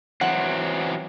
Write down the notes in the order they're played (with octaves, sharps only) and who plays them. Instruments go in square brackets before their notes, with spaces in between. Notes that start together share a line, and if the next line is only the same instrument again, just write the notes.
[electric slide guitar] E3 F#3 C4 [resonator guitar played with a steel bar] F#5